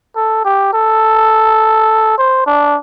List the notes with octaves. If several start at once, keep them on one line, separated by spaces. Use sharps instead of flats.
A4
G4
A4
C5
D4